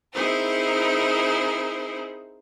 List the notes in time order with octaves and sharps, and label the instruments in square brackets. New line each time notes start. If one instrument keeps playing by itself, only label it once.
[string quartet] C4 D#4 E4 G#4 A#4 C5